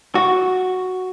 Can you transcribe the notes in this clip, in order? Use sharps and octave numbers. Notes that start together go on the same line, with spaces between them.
F#4